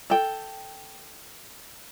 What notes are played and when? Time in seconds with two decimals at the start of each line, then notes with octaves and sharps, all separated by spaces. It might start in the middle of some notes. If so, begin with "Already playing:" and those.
0.10 A4 G5